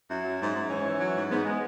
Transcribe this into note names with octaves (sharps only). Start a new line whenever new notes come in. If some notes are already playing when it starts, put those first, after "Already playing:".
F#2 E4
F#3
G#2
G#2
E3 C#4
E3
F#3
G#2
G#2 B3
G#3